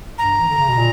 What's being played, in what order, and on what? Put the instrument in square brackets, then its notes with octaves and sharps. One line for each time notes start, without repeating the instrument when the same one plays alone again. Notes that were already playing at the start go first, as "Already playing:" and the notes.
[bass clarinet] G2 [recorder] A#5
[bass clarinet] E3
D3
C#3
B2
A#2